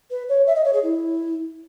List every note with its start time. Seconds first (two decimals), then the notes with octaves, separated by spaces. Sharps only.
0.10 B4
0.29 C#5
0.47 E5
0.55 D#5
0.65 C#5
0.73 G#4
0.83 E4